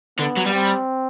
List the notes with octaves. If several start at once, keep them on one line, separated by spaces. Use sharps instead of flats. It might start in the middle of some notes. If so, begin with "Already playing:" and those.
D3 B3
F#3
G3
C4